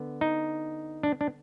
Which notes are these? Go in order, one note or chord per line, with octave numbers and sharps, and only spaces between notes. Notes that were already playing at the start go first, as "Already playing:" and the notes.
Already playing: D3 B3
D#4
D4
D4